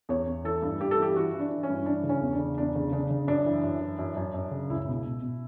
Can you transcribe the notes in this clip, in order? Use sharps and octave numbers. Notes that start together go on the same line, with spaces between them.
E2 C#5
E2
E3 A4
G2
G2 G4
A4
E3 G4
E3 F#4
E3
D4
E3
C#4
G2
E3 D4
C#3
C#4
E2
D4
C#3
E2 D4
C#3
C#3 D4
C#3
F#2 D4
E3
F#2
E3
F#2
F#2
F#2
C#3
C#2 E4
B2
B2
B2